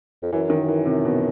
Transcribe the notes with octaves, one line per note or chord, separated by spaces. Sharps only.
F2
F#2 E3
D#3
E3
C3
B2